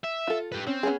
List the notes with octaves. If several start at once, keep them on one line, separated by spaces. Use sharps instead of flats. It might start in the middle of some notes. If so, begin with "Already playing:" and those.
E5
F4 A4
G4 B4
C4 C#4
B3 C#4 G#4